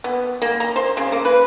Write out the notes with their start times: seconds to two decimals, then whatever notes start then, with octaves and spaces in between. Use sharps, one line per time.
0.04 B3
0.42 A#3
0.60 A#5
0.76 C5
0.97 C#3
1.12 A#3
1.25 B4